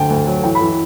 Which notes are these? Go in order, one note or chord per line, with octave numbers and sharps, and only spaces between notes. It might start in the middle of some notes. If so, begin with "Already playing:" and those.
Already playing: D2 D3 G5 A5
D2
F#3
E3 G5
B5
E3